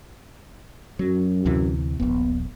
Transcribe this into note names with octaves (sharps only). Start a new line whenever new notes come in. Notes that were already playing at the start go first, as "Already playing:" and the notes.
F#2 F#3
D2 C3 E3
D#1 A#1 B3